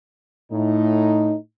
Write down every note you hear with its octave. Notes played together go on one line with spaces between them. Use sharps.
A2 D#4